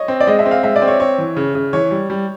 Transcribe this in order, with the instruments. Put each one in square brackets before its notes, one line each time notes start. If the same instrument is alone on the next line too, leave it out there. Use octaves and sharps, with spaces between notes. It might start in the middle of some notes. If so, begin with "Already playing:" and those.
Already playing: [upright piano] C#5 D#5
[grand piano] C4
[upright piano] D5
[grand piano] G#3 [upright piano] D#5
[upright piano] E5
[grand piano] C4
[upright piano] F5
[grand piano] G#3 [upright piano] E5
[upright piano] D5
[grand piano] C4
[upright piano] C#5
[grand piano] C4 [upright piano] C#5
[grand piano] E3
C#3
C#3
[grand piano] E3 [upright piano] C#5
[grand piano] G3
G3